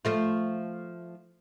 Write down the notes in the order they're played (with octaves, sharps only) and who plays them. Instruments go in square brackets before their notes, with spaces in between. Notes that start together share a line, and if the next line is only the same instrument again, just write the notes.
[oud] F3 A3 F4